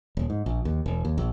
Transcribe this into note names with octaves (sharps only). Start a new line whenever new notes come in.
D#1
G#2
A#1
D#2
E1
D#2
A#1